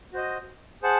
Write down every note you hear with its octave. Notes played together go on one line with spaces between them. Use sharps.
F#4 C5 D#5
G#4 C5 F#5 A5